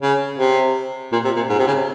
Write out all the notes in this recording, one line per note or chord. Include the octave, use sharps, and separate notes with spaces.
C#3
C3
A#2
C3
A#2
G#2
C3
C#3